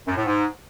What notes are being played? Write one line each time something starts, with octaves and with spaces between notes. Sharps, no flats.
F#2
A2
G#2